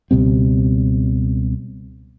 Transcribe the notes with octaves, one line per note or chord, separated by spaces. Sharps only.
C#2 B2 G3 C4